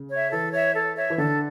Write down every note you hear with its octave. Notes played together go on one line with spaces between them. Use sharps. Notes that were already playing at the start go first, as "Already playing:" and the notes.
Already playing: C#3
C#5 E5
E3 A4
C#5 E5
A4
C#5 E5
E3
D3 A4